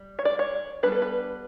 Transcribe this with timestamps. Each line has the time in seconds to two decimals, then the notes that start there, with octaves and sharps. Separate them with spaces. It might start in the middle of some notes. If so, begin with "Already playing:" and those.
Already playing: G3
0.19 C#5
0.25 D5
0.39 C#5
0.83 G3 B3 D4 B4
0.92 A4
1.02 B4